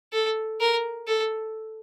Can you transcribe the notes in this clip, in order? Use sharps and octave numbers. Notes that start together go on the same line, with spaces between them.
A4
A#4
A4